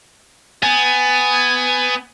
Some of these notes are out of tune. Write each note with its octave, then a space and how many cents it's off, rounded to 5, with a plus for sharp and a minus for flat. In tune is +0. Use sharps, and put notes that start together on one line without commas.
B3 +20 G#5 +0